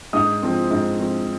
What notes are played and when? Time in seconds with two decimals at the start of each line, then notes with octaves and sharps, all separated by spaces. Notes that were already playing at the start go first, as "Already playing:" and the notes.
0.13 G#2 D#6
0.43 F3 C4
0.71 G#2
0.99 F3 C4